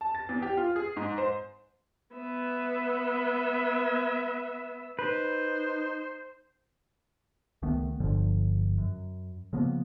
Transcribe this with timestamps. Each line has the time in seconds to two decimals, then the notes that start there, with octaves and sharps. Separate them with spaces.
0.01 A5
0.15 A6
0.29 E2
0.42 G4
0.57 F4
0.76 G#4
0.96 G#2
1.18 C5
2.16 B3 E5
4.99 D#4 B4 C5
7.62 C#2 D#3 A3 B3
8.00 G1 G2 D3 F3
8.78 F#2
9.53 C#3 F3 A#3 B3